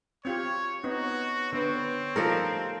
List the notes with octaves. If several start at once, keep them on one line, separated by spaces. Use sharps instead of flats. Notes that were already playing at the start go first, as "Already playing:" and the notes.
C4 F4 G4 C#5 C#6
B3 C4 D#4 F#4 C#5
D3 B3 C4 B4 C#5
F3 G3 A3 D#4 A4 A#4